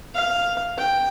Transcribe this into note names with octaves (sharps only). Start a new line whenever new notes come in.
F5
G5